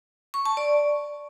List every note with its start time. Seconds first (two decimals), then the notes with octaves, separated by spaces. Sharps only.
0.34 C#6
0.46 A5
0.57 D5